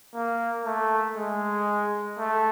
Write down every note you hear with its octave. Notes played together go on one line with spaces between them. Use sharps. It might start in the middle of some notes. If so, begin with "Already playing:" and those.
A#3
A3
G#3
A3